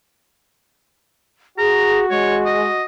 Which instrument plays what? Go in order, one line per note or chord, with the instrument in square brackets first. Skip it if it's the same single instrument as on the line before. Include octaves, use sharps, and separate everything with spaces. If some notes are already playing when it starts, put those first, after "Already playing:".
[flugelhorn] F#4 [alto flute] G#4 [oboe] A#5
[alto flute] G#3 [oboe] C#5
[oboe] D#5